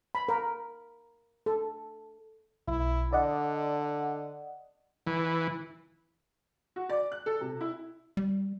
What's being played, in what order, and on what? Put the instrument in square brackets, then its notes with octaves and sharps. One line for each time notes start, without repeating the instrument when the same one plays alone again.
[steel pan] B5
A#4
A4
[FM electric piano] B1 [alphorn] E4
[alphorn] D3 [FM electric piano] D5 D#5 F#5
[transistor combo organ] E3
[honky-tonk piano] F#4
D5
F#6
A4
C3
E4
[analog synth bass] G3